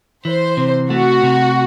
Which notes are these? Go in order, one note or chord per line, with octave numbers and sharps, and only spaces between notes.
E3 C5
C3
A3 F#4
C3